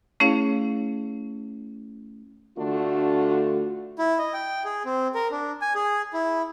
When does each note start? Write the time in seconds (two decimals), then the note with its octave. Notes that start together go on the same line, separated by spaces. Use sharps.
0.20 A3 C#4 E4 G#4 C#5 F5
2.58 D3 A3 D4 F4 F#4
3.99 E4
4.19 D#5
4.34 G5
4.65 G#4
4.85 C4
5.15 A#4
5.31 D4
5.62 G#5
5.75 G#4
6.13 E4